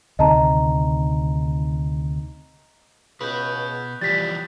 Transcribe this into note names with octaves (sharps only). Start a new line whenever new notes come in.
D2 C3 D#3 D#5 A5 A#5
C#2 B2 B4 D#6 F#6 G6
E3 F3 G3 G4 A6 B6